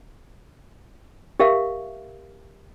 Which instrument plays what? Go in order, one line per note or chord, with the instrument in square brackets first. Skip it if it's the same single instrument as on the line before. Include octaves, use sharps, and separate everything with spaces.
[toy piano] G4 A#4 E5 F5